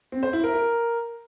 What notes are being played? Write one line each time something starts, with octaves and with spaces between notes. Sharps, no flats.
C4
C5
E4
A#4
A#4